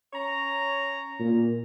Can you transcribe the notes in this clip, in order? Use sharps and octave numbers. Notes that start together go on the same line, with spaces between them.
C#4 C#5 A#5
A#2